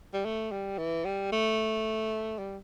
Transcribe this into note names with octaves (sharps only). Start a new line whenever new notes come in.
G3
A3
G3
E3
G3
A3
G3